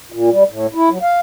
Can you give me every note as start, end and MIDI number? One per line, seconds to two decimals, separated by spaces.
0.12 0.30 46
0.30 0.44 55
0.49 0.67 45
0.74 0.89 64
0.90 0.98 54
1.02 1.20 77